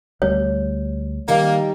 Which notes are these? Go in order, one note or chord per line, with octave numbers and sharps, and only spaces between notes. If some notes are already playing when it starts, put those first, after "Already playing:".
D2 G3 A3 C#5
D#3 G3 A#3 D#4